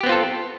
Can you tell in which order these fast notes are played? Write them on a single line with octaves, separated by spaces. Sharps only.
G4 B3 C4 F4 A4